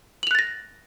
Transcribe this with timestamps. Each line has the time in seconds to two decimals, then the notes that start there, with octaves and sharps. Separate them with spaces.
0.23 F#7
0.27 F7
0.31 F#6
0.35 A6
0.39 A#6